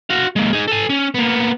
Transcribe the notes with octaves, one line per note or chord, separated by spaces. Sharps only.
F#4 F5
G#3 A#3
D#4 G#4
A4 G#5
C#4
A#3 B3